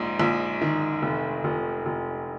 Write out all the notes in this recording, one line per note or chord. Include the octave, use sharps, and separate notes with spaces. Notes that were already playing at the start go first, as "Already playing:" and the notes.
Already playing: A#1 G#2
A#1
D#3
F1
F1
F1